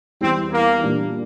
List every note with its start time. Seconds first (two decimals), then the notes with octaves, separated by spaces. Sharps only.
0.21 E2 E3 G3 C4
0.52 A#3
0.82 A#2 G3 A#3 D4